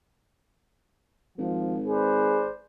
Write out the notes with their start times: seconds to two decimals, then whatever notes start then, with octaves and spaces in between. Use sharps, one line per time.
1.38 G#1 F3
1.86 G#4 B4 C5 D5